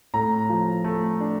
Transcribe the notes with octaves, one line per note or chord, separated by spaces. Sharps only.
A2 A#5
F3
A3
D4